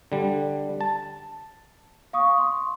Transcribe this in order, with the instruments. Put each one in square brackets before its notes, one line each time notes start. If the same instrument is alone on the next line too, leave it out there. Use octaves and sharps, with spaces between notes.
[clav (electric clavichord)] D3 G3
A5
[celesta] F5 C#6 D#6
C6